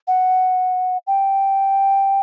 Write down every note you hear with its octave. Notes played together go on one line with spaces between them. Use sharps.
F#5
G5